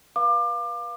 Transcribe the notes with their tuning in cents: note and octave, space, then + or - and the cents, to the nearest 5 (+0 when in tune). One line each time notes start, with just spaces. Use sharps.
B4 -30 F5 +0 D6 +30